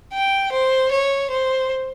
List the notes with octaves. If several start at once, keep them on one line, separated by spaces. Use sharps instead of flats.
G5
C5
C#5
C5